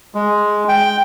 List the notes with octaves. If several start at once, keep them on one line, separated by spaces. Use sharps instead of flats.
G#3
G5